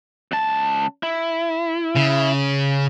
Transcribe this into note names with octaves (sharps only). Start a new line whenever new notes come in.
C#2 A5
E4
C#3